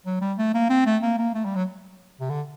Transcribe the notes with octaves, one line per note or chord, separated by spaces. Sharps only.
F#3
G3
A3
A#3
C4
A3
A#3
A#3
A3
G3
F#3
C3
D3